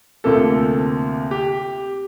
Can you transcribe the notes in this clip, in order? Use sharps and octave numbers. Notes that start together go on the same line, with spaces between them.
D2 C3 F3 A#3 A4
G4